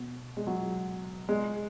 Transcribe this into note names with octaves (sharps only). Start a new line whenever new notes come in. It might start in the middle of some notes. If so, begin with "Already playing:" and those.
Already playing: B2
G#3
F#3
G#3